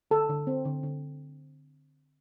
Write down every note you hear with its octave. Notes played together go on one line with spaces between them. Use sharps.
D3 A4
D3
C4
D3
D3